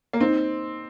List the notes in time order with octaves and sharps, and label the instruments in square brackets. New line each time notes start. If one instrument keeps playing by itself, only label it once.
[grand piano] A#3
[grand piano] C4 [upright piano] D#4